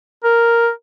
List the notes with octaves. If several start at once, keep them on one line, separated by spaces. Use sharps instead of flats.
A#4